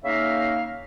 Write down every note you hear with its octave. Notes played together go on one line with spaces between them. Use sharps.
C#3 A#3 D#4 E5 F5